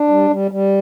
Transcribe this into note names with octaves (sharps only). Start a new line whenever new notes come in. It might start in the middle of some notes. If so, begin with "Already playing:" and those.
Already playing: D4
G3
G3
G3